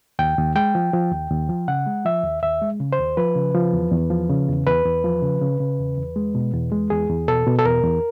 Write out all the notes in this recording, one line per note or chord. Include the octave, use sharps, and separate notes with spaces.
D#2 G5
D#2
G#3 G5
F3
F3
D#2
D#2
F3
C#3 F#5
G#3
F3 E5
D#2
D#2 E5
G#3
C#3
C5
D#2
F3 B4
C#3
F3
E2
E2
F3
C#3
E2
E2 B4
E2
F3
C#3
C#3
C#3
E2
E2
G#3
B2
E2
G#3
E2 G#4
E2
B2 A4
B2
A4
E2 A#4
E2